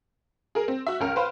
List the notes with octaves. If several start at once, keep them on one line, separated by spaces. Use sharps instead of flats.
G#4 A#4
C4
F#4 E5
C#2 C#4 A#4 F6 D7
B4 C5 F5